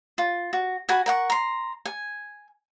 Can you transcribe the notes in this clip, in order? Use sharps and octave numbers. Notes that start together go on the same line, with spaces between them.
F4
F#4
F#4 F#5 G#5 B5
A#4 F#5 C#6
A#5 C6
G#5